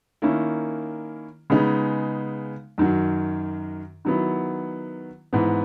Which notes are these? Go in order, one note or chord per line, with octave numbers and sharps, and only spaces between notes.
D#3 A#3 C#4 E4
C#3 G#3 B3 D#4
F#2 D#3 F#3
D#3 F#3 B3 E4
G#2 E3 B3